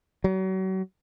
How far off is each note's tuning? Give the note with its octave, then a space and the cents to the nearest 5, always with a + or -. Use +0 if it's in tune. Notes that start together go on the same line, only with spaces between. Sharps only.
F#3 +35